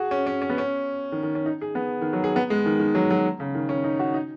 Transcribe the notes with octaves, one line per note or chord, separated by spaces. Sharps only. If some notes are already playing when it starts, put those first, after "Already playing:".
Already playing: F#4 G#4
C#4
C#4
C#4
B3
C#4
D#3
D#3
C#4
D#4
G#4
B3
D#3
F#3
G#4
B3
G#3
D#3
D#3
F#3
F#3
C#3
D#3
C#4
D#4
F#4
D#4